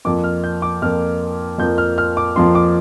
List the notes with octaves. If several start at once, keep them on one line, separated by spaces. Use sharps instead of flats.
F2 F3 A#3 D6
F6
G6
D6
F2 F3 A#3 F6
F2 F3 A#3 G6
F6
F6
D6
F2 F3 A#3 C6
D6